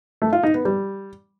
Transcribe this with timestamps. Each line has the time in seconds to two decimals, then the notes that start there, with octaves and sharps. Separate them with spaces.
0.22 A3
0.33 F4
0.43 D#4
0.54 B3
0.65 G3